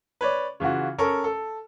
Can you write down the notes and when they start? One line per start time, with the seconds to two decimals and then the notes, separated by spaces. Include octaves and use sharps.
0.21 B4 C#5 D5
0.60 C#3 E3 F4 F#4
0.98 C#4 A4 A#4 C#6
1.24 A4